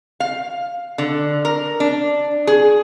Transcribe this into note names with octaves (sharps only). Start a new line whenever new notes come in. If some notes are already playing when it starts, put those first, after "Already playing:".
F5
D3
A#4
D4
G#4